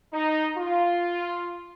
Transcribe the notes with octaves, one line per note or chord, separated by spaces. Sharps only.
D#4
F4